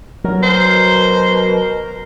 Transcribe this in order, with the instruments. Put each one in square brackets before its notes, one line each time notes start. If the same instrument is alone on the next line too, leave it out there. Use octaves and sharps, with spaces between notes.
[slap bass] F#3 [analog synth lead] A#4
[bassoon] B2 [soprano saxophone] C5